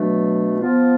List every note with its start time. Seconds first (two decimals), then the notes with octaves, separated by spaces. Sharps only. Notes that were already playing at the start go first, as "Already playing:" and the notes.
Already playing: B2 F#3 A3 D4
0.60 F3 B3 F4